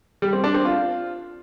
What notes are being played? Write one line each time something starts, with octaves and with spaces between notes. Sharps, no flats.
G3
C4
D4
C4
F4